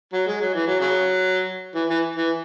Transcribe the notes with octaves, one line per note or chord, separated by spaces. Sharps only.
F#3
G#3
F#3
E3
F#3
C#3 F#3
E3
E3
E3